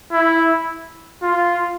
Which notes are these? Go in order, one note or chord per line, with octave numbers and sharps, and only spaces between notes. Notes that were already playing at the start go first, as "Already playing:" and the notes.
E4
F4